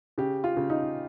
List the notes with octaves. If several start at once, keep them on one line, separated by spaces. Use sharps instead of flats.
C#3 G4
F4
C#3
D#4